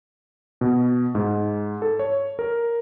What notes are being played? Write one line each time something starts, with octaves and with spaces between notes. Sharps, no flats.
B2
G#2
A4
C#5
A#4